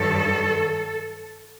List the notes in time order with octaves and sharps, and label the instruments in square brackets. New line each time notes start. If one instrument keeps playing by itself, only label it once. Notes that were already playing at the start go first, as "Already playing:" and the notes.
Already playing: [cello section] G2 D#3 F#3 A4